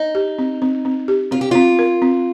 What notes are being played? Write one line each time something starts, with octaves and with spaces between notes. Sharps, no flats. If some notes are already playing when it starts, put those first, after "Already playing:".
Already playing: D#4
G4
C4
C4
C4
G4
C4 F4
G4
C4 F4
A#4
C4